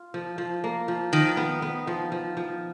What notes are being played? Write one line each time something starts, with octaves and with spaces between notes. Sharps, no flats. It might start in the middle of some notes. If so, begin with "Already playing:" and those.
Already playing: F4
F3
F3
A#3
F3
D#3 F3
B3
B3
F3
F3
F3